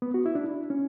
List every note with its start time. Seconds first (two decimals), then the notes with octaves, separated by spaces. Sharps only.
0.02 B3
0.14 F#4
0.26 E4
0.35 D4
0.44 E4
0.70 C#4